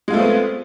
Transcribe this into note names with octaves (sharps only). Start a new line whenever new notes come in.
G#3 A3 B3 C4 F4